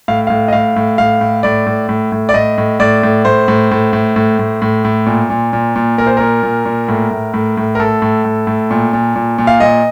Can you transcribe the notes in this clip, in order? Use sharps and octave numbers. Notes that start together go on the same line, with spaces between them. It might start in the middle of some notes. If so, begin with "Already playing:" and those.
A2 F5
A2 F5
D#5
A2 F5
A2
A2 F5
A2
A2 D5
A2
A2
A2
D5
A2 D#5
A2
A2 D5
A2
A2 C5
A2
A2
A2
A2
A2
A2
A2
A#2
A#2
A#2
A#2
A#2 A#4
C5
A#2 A#4
A#2
A#2
A2
A2
A2
A2
A#4
A2 A4
A2
A2
A2
A#2
A#2
A#2
A#2
F5
A#2 D#5